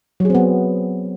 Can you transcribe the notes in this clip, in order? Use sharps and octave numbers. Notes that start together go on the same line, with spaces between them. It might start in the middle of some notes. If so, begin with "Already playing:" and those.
F#3 B3 C4 G#4